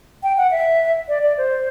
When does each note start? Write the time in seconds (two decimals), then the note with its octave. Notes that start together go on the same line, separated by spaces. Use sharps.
0.23 G5
0.37 F#5
0.51 E5
1.08 D5
1.23 D5
1.38 C5